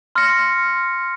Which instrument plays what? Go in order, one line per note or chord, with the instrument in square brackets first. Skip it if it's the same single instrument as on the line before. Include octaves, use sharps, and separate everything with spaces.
[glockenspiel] C6 F6 A#6 C#7